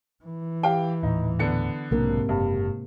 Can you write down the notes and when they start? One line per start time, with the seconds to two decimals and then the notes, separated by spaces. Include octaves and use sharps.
0.24 E3
0.63 G4 F5 G5
1.03 D#1 A2 D#4
1.39 D3 B3 C#7
1.91 B1 G#2 C3 F#3 A#3 D4 A#4
2.29 F#1 G2 G3